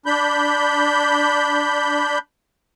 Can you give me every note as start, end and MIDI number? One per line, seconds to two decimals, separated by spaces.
0.06 2.18 62
0.06 2.18 83
0.06 2.18 91